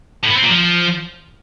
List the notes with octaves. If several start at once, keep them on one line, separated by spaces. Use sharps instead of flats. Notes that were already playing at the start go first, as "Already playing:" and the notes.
A2
B3
C4
A#2
F3